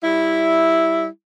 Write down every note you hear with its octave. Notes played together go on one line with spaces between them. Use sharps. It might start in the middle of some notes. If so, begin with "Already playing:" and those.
G3 E4